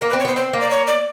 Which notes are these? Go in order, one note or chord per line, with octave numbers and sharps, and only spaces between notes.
A#3 A#4
B4
C4
C#5
B3 C5
C4 C5
A#3
D5
C#5
D5